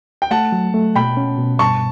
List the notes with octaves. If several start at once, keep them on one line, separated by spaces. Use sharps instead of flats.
G5
A3 F#5 A5
F#3
A3
B2 G5 B5
C#4
B2
G2 A5 C#6